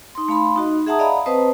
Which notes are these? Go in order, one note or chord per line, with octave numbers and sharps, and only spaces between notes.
D#4 C6
A3 F5 B5 C6
D#4 F#4 D#5
G#4 E5 F#5 A5 A#5 D#6
D5 D#5 F5 F#5 A#5 B5
C4 B4 C5 D#5 A5 D#6